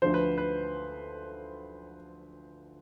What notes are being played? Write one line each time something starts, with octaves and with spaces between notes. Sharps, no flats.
D2 D3 F3 C5
B4
B4